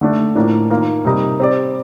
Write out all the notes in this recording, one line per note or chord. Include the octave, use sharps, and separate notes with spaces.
D3 A3 D4
A2 F3 A#3 D4
D#3 A#3 F4 A#4
C3 G3 A#3 D#4
C4 G4 D5